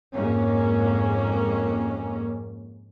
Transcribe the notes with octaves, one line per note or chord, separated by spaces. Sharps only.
F2 G#2 G#3 A#3 C#4